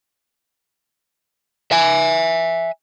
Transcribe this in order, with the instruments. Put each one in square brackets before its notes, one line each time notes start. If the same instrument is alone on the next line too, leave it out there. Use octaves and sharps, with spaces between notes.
[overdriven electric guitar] E5 G#5